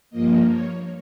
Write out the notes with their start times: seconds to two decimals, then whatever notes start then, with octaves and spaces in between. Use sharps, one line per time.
0.10 G2 F3 A#3 D#5
0.49 C#5